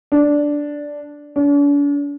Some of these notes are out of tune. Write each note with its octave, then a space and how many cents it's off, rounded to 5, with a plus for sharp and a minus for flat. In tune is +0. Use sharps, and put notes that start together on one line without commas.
D4 -5
D4 -45